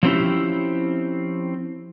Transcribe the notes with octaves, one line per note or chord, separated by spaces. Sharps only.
F3 F#3 C4 C#4 E4 G4